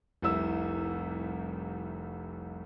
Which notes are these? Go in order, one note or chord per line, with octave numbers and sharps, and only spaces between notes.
F1 C2 E4 E6